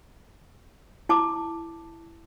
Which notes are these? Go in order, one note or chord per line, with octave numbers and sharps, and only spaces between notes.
E4 A5 D6